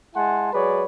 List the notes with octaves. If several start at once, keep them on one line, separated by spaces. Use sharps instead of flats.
G#3 E4 F#5 G#5 A5 C6
F#3 G#3 G#4 B4 C#5 D5